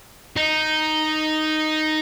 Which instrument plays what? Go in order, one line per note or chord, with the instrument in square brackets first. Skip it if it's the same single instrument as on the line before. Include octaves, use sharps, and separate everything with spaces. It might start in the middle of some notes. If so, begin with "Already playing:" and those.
[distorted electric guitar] D#4